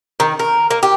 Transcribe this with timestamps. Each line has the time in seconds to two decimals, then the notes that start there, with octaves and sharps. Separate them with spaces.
0.20 D#3
0.39 A#4
0.71 A#3
0.83 G4